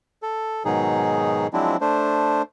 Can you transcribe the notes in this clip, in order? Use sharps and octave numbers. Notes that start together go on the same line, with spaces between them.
A4
G#2 B2 D#3 F#3 D#4 G#4
F3 F#3 G#3 C4 D4 E4
A3 D4 C5